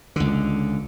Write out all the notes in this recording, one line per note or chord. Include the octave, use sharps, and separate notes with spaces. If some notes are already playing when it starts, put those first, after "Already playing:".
C#2 D3